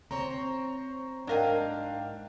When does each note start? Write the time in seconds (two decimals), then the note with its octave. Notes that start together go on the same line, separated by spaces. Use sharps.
0.11 C4 C5 C#5 A#5
1.27 G#2 F#3 D4 A#4 D#5 F5 G5